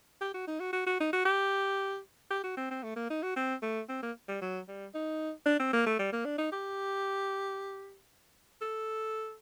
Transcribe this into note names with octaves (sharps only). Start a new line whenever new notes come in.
G4
F#4
D#4
F#4
F#4
F#4
D#4
F#4
G4
G4
F#4
C4
C4
A3
A#3
D#4
F#4
C4
A3
C4
A#3
G3
F#3
G3
D#4
D4
C4
A#3
A3
G3
A#3
D4
D#4
G4
A4